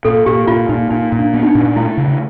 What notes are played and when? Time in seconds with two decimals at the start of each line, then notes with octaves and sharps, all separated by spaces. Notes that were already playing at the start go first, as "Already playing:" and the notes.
0.05 A#2 A4
0.26 A#2 G4
0.47 A#2 F4
0.69 A#2 D#4
0.90 A#2 D#4
1.12 A#2
1.19 D4
1.34 B3
1.43 D#4
1.47 D4
1.55 A#2
1.76 A3 E4
1.97 C#3